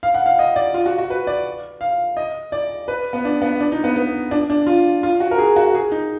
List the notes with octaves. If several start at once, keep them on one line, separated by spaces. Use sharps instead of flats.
F5
F#5
F5
D#5
D5
F4
F#4
F#4
B4
D5
F5
D#5
D5
B4
B3
D4
B3
D4
D#4
B3
B3
D4
D4
F4
F4
F#4
A#4
G#4
F#4
G#4
D#4